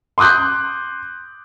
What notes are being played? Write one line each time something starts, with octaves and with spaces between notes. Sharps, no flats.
C6 D6 D#6 F#6 G6